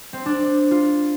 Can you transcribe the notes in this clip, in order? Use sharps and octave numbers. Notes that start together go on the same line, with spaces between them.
C4
D4
F4